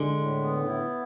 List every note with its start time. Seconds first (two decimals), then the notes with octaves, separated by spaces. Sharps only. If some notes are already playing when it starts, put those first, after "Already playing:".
Already playing: D3 G#3
0.17 A2
0.42 B3
0.67 E4